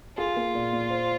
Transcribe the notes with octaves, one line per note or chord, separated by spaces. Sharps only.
F4 G#4
A#3
A#2
A#2
C5